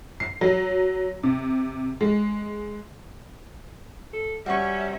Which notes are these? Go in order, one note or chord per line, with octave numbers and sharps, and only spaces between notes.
C7
F#3
C3
G#3
A4
G3 C#4 F#4 E5 A#5 C#6